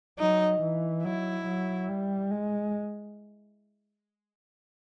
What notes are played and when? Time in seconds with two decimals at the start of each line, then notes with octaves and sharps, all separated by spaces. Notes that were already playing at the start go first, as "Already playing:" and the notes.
0.19 F#3 D#4
0.61 E3
1.03 F#3 E4
1.46 F#3
1.89 G3
2.31 G#3